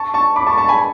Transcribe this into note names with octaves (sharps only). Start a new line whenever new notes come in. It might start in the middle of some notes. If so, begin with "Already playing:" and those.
Already playing: A5 C#6
A5 C#6
B5 D6
A5 C#6
A5 C#6
G#5 B5